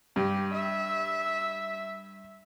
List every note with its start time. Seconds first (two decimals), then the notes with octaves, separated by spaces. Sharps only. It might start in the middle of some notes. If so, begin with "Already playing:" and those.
0.16 G2 G4
0.54 E5